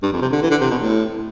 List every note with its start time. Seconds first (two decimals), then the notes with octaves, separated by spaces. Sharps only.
0.03 G2
0.12 F2
0.22 C3
0.32 D3
0.42 E3
0.51 D3
0.61 C3
0.70 B2
0.81 A2